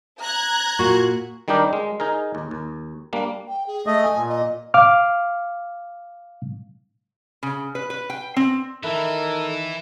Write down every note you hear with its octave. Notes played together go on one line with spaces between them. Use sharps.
A#5 F#6 G#6
A#2 F#4
D#3 G3 D4 D#4 G4 A#4
G#3
D#4 G#4 A#4
D#2
D#2
G3 A#3 D4
G5
G#4
A3 D#5 D#6
G#5
A#2
D#5
F5 D6 F6
C#3
B4
B4
G5
C4
D#3 E3 E4 A4 A#4